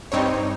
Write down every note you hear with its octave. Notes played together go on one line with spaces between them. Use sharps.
G2 G3 C4 D#4 C#5